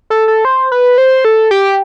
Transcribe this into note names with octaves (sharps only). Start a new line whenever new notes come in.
A4
A4
C5
B4
C5
A4
G4